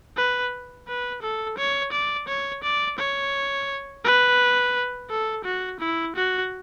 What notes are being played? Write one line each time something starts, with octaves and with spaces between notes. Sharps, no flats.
B4
B4
A4
C#5
D5
C#5
D5
C#5
B4
A4
F#4
E4
F#4